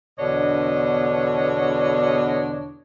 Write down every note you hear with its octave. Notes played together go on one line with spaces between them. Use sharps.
E2 B2 D3 D4 C#5 D#5